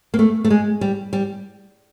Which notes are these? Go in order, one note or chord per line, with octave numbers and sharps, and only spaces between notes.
A#3
A3
A3
G#3
G3
G3